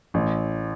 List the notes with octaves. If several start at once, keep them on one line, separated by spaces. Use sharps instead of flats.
A1